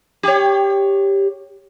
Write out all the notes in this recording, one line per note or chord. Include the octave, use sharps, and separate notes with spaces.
G4 C#5